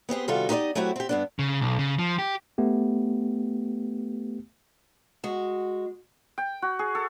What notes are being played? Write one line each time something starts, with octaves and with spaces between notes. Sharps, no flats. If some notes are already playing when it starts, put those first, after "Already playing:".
B3 C4 G4 G#4
C3 D#3 G3 F4 F#4 A4
D#4 G4 B4 C5 D5 D#5
F#3 A3 C4 E4 F#4 G4
C4 G4
G2 B3 D4
C#3
B1
C#3
F3
G4
A3 B3 G4
G#3 F#4
G5
F#4
G#4
A4